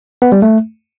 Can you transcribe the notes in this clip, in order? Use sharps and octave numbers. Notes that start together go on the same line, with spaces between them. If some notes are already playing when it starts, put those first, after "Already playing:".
B3
G3
A3